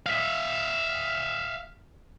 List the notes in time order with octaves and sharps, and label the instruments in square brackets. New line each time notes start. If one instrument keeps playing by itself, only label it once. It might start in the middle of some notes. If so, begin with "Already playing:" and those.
[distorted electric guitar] E5 F5